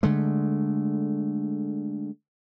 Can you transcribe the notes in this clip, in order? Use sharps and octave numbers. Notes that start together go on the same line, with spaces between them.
D3 G#3 A3